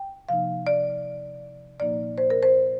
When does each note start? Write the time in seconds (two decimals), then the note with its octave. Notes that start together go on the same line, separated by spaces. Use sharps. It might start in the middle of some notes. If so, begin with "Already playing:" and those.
Already playing: G5
0.29 C3 F3 A#3 D#4 F5
0.67 D5
1.80 A#2 F3 A#3 D#4 D5
2.18 C5
2.30 A#4
2.43 C5